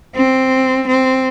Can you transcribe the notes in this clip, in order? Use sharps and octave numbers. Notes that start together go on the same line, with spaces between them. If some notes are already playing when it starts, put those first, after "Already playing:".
C4
C4